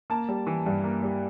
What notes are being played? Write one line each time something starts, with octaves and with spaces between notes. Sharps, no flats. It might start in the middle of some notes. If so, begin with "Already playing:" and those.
A#3 A5
G3
E3
G2
A#3
G3